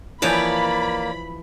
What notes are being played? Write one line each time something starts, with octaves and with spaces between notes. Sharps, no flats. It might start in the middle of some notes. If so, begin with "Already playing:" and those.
E3 F3 A#3 C#5 D5 B5